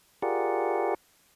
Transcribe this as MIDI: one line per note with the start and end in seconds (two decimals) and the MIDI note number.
0.22 0.95 65
0.22 0.95 67
0.22 0.95 68
0.22 0.95 70
0.22 0.95 74
0.22 0.95 78